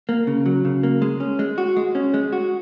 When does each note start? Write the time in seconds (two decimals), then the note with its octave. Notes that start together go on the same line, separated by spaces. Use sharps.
0.09 A#3
0.27 C#3
0.46 F#3
0.65 C#3
0.83 A#3
1.02 G#3
1.20 C#4
1.39 G#3
1.58 F#4
1.77 G#3
1.95 C#4
2.14 G#3
2.33 F#4